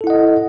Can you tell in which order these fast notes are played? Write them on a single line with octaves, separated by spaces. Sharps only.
A4 E4 F#5 D#5